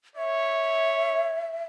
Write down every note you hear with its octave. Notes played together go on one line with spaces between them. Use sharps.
C#5 E5